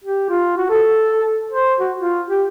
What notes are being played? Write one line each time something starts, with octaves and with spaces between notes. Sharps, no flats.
G4
F4
F#4
A4
C5
F#4
F4
G4